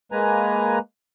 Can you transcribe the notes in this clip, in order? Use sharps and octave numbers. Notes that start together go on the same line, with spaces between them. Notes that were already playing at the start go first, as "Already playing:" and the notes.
G#3 A#3 B4 G#5 A#5